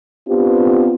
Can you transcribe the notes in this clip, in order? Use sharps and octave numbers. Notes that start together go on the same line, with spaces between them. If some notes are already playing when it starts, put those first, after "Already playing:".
B3 C4 D4 F4 G4